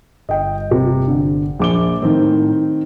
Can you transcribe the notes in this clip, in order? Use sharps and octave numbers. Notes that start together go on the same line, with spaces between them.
G1 D#5 G5
C3
D3
A#1 D6 G7
A2 D#3 C4